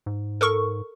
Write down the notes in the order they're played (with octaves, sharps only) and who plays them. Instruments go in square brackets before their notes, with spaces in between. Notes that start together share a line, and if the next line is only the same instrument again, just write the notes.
[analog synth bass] G#2
[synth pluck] A4 A#4 C#6